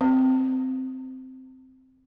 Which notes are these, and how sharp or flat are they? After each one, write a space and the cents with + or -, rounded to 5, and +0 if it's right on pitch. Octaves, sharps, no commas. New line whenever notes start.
C4 -10